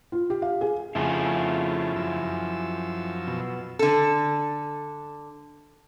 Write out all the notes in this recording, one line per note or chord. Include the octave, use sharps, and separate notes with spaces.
F4
G4
F5
G#4
F2 C#3 A3 E4 F4 G#4
F#2 F3 E6
B2
D3 A4